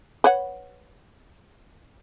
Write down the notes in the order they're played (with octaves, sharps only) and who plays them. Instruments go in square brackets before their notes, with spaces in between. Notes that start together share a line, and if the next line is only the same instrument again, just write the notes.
[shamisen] B4 C#5 F#5